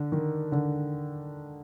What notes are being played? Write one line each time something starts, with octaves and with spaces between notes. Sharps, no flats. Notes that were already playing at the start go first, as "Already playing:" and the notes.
Already playing: D3
D#3
D3